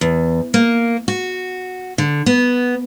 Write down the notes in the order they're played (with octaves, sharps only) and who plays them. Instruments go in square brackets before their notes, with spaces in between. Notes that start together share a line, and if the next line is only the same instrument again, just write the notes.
[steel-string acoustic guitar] E2
A#3
F#4
D3
B3